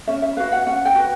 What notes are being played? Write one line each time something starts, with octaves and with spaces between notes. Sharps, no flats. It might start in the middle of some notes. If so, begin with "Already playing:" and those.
C#4 E5
E5
F#4 B4 F5
F#5
C#4 F#5
G5
F#4 B4